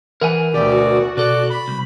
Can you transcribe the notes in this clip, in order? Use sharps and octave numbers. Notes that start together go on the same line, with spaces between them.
E3 A#4 F#5 G#5
D2 B2 G4 D5
F#4
B2 A4 D5 F#6
B5
C2